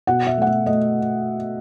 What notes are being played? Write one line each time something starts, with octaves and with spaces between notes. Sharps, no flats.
B2 F#5
E5
A3 F#5
E5
A3 D#5